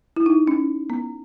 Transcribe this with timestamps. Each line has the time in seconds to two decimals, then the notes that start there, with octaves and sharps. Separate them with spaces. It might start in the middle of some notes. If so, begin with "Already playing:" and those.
0.16 E4
0.26 D#4
0.47 C#4
0.90 B3